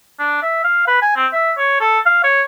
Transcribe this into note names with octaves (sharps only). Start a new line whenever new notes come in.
D4
E5
F5
B4
G#5
C4
E5
C#5
A4
F5
C#5